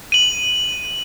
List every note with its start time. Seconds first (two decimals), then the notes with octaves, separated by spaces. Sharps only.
0.12 D#7 F#7